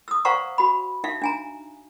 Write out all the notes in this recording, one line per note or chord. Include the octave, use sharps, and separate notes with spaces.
D#6 E6
C5 D5 F5 F#5 A#5 C#6
F#4 B5
D#4 E5 F5
D4 G#5 A#5